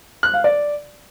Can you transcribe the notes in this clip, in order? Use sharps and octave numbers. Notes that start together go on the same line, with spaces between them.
F#6
F5
D5